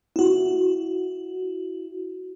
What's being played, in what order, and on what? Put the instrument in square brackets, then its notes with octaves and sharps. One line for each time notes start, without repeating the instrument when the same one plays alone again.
[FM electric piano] E4 F#4